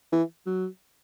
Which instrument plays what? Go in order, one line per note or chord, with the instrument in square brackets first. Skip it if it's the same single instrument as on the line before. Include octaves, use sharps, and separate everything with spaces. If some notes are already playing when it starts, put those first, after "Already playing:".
[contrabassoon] E3
F#3